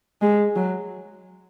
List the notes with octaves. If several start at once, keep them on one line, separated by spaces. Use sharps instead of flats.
G#3
F#3